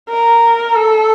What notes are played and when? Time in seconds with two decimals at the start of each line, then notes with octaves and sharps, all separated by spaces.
0.10 A#4
0.76 A4